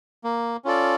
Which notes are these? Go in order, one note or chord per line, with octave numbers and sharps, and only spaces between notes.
A#3
C#4 F4 A4 D5